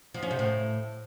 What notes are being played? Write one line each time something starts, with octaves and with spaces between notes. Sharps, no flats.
F3
C#4
C3
A2